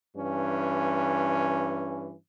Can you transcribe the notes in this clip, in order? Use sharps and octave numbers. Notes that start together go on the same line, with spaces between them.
G2 E3 C#4